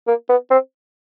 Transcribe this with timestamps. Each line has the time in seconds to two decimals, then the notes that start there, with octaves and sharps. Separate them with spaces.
0.08 A#3
0.29 B3
0.51 C4